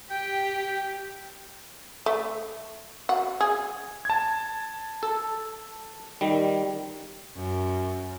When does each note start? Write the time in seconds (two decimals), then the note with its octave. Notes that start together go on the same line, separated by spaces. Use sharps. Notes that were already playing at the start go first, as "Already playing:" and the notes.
0.10 G4 G5
2.06 A3
3.09 F#4
3.41 G#4
4.05 A5 G#6
5.03 A4
6.21 D#3 G3
7.37 F#2